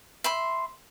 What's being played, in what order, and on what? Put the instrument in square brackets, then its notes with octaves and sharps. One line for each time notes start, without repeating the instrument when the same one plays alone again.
[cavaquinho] E5 B5 C6